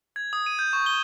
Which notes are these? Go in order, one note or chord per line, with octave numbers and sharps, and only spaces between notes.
G#6
D#6
D#7
G6
C#6
G7